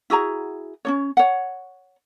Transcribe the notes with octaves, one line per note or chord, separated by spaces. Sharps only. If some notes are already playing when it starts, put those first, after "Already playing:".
E4 F#4 G#4 A#5
C#4 D4 C#5
C#5 F#5